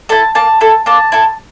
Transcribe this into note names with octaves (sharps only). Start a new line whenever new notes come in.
E4 A4 A5
A#3 A5
E4 A4
A#3 A5
E4 A4